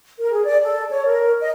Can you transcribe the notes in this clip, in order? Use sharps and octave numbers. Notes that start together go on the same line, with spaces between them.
A#4
G#4
D5
A4
C#5
A#4
D#5